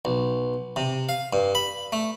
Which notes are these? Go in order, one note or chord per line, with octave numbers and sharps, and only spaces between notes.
B1
C3
F5
G2
B5
A3